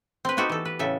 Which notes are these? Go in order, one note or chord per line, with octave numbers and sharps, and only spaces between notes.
C4 B4
B3 D#4 F#4 G4 A4
E3 A4
B4
A2 C#3 A4 E5